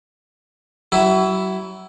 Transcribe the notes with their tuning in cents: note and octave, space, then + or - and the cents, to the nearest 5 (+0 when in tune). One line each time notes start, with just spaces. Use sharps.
F#3 +35 E4 +0